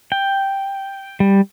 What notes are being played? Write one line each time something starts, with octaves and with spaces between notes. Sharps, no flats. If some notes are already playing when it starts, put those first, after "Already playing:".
G5
G3